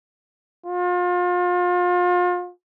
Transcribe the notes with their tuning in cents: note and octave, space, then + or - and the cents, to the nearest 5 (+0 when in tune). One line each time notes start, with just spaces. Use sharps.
F4 +35